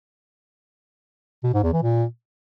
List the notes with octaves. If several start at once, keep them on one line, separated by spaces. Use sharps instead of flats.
B2
G#2
E2
E3
A#2